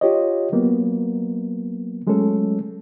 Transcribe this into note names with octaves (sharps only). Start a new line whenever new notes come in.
F4 G4 C#5 D#5
F#3 A#3 B3
F#3 G#3 A3 C#4 A4